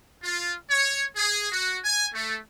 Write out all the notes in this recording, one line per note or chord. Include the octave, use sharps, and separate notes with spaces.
F4
C#5
G#4
F#4
G#5
A3